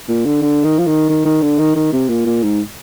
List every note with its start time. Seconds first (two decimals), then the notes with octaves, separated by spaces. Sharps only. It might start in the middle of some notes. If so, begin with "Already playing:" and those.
0.08 A#2
0.25 D3
0.42 D3
0.64 D#3
0.78 F3
0.87 D#3
1.09 D#3
1.25 D#3
1.42 D3
1.59 D#3
1.75 D#3
1.92 C3
2.09 A#2
2.26 A#2
2.43 G#2